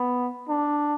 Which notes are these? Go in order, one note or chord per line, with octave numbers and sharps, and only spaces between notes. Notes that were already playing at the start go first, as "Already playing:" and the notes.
Already playing: B3
D4